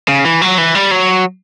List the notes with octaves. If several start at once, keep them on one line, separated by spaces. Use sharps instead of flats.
C#3
E3
F#3
E3
G3
F#3